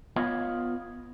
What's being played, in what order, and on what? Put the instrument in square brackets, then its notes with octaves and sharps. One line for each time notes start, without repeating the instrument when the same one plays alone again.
[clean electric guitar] B3 F4 C#5 D#5